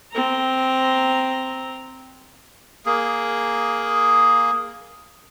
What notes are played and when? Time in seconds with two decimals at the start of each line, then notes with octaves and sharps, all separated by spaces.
0.12 C4 A#5
2.86 A#3 G#4